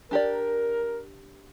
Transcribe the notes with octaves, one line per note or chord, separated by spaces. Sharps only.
D4 G4 A#4 D5